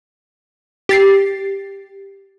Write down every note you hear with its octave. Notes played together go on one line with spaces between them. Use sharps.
G4 A6 C7